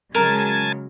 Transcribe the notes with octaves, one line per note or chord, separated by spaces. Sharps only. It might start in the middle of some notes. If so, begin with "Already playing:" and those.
C#3 F#3 G#3 A#4 G#5 A5